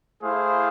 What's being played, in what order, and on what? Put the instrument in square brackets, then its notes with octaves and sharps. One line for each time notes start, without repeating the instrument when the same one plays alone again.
[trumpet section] A3 E4 G#4 C5 F5